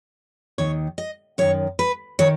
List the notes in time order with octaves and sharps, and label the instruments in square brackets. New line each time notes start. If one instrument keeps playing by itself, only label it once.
[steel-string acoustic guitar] D#2 D#3 C#5
D#5
F#2 D#3 C#5
B4
D#3 C#5